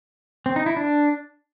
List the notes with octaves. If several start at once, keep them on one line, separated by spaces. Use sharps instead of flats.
C4
D#4
E4
D4